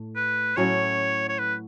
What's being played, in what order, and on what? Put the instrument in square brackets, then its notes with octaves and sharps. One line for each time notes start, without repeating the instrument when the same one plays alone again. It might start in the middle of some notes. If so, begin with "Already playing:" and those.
Already playing: [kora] A2 A3
[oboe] B4
[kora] A2 F#3 C#4 E4 [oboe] C#5
[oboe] C#5
B4